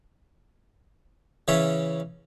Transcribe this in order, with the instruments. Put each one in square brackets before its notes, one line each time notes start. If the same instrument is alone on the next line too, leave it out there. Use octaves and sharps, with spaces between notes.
[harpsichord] C#3 E3 C#4 C#5 E5